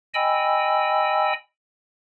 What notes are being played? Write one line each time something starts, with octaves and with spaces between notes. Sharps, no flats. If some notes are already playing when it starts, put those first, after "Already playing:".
D#5 G5 G#5 B5 E6